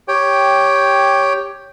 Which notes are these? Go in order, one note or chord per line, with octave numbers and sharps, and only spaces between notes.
G4 C#5 G5